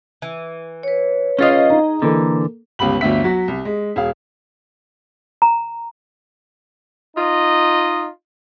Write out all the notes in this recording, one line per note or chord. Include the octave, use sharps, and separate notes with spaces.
E3
B4 C#5
C#4 F4 G#4 D#5 F5
D#4 A#5
D3 E3 A#3 A4
G1 C#2 G3 B5 F#7
G1 D2 D4 E5 B6
F#3 F#4
C2
G#3
E1 G#4 F5
A#5
D#4 F4 D#5